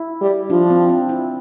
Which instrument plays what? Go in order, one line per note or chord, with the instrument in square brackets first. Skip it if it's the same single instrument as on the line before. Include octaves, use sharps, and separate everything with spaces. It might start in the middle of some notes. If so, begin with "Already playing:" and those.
Already playing: [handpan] E4
[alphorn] G3
[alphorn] F3 [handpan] D4
[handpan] C4
C4
E4